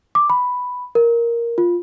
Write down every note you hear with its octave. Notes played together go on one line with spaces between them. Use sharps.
D6
B5
A#4
F4